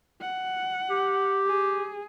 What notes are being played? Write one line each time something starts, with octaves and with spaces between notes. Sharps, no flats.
F#5
G4
G#4